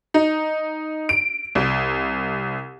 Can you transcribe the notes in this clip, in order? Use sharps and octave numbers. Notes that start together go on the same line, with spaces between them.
D#4
D7
C2